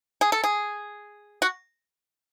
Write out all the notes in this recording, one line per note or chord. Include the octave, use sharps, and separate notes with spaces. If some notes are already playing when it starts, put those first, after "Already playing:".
G#4
A4
G#4
F#4